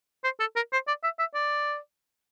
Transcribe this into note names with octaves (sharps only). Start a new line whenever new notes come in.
C5
A4
A#4
C5
D5
E5
E5
D5